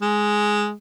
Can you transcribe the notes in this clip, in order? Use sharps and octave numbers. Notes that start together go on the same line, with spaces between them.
G#3